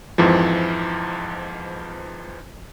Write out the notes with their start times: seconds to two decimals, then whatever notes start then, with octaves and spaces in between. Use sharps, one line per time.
0.18 F2 G#2 E3 F3